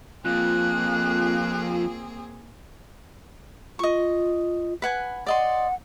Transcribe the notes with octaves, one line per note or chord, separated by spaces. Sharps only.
F2 A#3 C4 F4 G#4 F#6
F4 D#5 C#6
B4 F#5 G#5
D5 D#5 F#5 C6